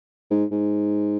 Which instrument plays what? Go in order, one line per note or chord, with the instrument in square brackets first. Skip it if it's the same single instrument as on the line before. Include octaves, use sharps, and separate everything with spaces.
[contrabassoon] G#2
G#2